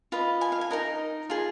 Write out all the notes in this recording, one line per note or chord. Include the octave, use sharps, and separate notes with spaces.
F4 B4 D#5
G#5
F5
G#5
D#4 A#4 D#5
F4 G#4